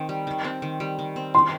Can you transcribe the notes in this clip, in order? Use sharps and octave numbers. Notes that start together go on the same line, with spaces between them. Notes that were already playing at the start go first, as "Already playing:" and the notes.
Already playing: D#3 C4
G3
D#3
C4
D#3
G3
D#3
C4
D#3 C6